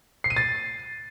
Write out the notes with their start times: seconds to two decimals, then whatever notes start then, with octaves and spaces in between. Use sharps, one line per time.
0.24 C7
0.30 D#7
0.36 A6